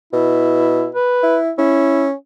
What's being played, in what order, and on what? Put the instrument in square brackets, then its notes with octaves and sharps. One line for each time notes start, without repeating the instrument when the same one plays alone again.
[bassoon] B2 [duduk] E4
[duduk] B4
[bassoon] E4
[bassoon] C#4 [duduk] E4